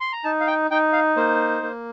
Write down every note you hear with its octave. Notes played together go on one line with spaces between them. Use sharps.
C6
A#5
D#4 A5
F5
G5
D#4 G5
F5
A#3 C5
A#3